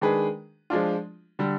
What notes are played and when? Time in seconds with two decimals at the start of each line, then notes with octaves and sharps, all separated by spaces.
0.01 D#3 G#3 D4 G#4 B4
0.70 F3 G#3 D4 F4
1.39 D3 G3